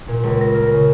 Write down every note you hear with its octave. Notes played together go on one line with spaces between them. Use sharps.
A#2
C#2
A#6
A#4
C#3